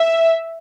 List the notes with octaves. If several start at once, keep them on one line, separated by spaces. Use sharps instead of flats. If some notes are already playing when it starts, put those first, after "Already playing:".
Already playing: E5